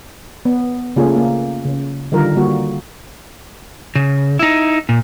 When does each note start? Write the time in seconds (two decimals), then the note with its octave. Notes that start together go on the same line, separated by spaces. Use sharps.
0.45 B3
0.96 C#3 A3 A#3 F4 G#4
1.16 A#3
1.65 C#3
2.12 D3 D#3 G3 F4 A#4
2.36 D3 G3 A#3 F#4
3.95 C#3
4.39 D#4 E4
4.89 A#2